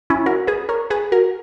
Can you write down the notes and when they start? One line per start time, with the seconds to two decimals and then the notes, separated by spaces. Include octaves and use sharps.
0.10 C#4 E4
0.26 F#4 A#4
0.47 G#4 B4
0.69 A#4 C#5
0.90 G#4 B4
1.12 F#4 A#4